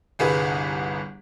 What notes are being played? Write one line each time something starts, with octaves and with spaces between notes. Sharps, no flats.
G1 C2 G#4 B4